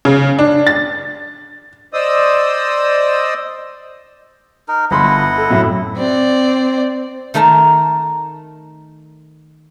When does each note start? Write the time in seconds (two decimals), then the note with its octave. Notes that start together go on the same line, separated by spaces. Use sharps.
0.05 C#3
0.39 D4
0.67 A6
1.94 C5 D5 D#5 D#6 E6
4.68 D#4 A#4
4.91 G1 E4 D#5 F#5 B5 C6
5.38 A4
5.50 F#2 A2 E5
5.97 C4 D5
7.34 D#3 A3 D#4 A#4 A5